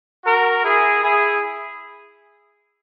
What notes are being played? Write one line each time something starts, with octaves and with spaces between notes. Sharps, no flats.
F#4 A#4
E4 G#4
E4 G#4